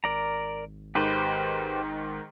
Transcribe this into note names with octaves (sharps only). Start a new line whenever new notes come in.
G#1 A#4 D5 A#5
G#2 D#3 G4 B4 C5 G5